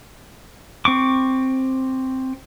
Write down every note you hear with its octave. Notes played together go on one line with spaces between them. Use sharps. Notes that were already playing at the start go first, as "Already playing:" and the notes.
C4 C#6 D6